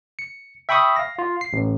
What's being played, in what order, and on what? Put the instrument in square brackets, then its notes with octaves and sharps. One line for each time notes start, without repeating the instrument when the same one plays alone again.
[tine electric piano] C#7
E5 G5 B5 C#6 D#6
F5 A#6
F4
C7
A1